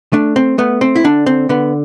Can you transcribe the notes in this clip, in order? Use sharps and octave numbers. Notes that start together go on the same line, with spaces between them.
A3 D4
C4
A3 B3
C4
E4
D3 D4
C4
D3 B3